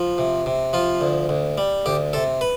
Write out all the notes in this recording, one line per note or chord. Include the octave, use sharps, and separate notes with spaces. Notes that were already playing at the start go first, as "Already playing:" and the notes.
Already playing: F3
C3
C3
F3 F4
D2
D2
G3
D2 G4
C3 A4
B4